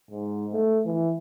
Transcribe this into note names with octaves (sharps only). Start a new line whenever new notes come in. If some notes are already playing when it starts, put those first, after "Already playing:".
G#2
A3
E3